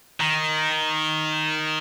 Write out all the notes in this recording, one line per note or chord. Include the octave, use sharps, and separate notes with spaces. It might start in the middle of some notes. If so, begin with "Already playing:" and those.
D#3